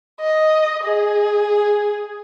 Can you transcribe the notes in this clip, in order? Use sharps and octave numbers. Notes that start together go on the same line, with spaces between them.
D#5
G#4